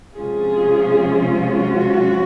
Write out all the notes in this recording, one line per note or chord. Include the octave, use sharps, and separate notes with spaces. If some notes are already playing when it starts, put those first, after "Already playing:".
C3 F3 G#3 C#4 F4 G#4
F#4